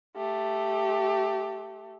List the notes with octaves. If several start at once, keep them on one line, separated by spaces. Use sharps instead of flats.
A3 G4